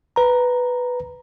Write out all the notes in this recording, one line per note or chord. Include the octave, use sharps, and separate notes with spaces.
B4 A#5